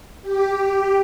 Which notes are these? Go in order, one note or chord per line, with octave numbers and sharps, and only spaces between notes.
G4